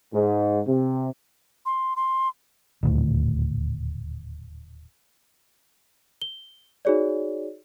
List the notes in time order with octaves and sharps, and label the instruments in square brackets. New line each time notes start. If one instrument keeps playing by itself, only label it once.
[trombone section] G#2
C3
[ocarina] C6
C6
[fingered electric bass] D#1 D2 A2
[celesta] G7
D#4 F#4 G#4 C#5 D5